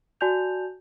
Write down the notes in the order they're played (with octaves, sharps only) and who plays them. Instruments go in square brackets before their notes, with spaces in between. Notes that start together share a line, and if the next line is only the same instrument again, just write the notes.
[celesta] F#4 D5 G#5 A5 G6 F7